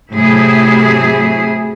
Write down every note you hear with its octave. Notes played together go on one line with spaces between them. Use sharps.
A2 C3 F#3 E4 G#4